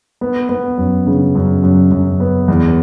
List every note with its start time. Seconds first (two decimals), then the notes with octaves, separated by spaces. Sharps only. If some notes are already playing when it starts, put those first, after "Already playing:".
0.21 B3
0.49 B3
0.78 F#2
1.07 C#3
1.35 F#2
1.63 F#2
1.91 F#2
2.20 B3
2.48 E2